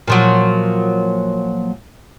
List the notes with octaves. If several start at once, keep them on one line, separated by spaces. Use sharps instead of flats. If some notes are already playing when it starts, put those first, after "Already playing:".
A#2 F3 F#3